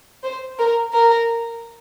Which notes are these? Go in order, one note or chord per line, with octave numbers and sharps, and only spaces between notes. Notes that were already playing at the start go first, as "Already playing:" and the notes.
C5
A#4
A#4